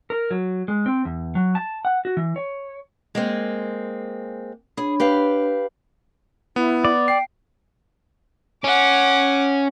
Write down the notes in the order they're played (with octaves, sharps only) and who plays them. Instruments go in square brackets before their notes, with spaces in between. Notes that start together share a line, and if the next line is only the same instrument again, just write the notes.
[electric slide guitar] A#4
F#3
G#3
C4
E2
F#3
A5
F#5
F#4
E3
C#5
[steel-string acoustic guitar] G#3 A#3 C4
[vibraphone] D4 C#5 B5 [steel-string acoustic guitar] G#4
[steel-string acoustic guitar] G4 B4 F5
[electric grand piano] B3 [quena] E4
[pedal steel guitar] D5
[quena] G5 [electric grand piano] C7
[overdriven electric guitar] C#4 [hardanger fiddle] F#5 D6